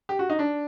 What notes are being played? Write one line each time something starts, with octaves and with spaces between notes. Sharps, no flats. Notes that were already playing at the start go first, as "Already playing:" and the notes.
G4
F#4
D#4
D4